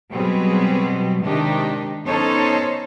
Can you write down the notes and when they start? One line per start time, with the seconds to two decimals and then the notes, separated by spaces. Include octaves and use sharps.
0.11 B2 F#3 G3 C4 G#4 B4
1.23 C3 D#3 G#3 D4 D#4 G4
2.05 B3 C#4 D#4 A4 C5 C#5